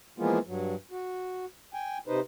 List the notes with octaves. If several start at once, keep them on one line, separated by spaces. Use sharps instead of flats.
E3 F3 G#3 A#3 B3 F4
G2 F#3
F#4
G5 G#5
C3 D#4 B4 C5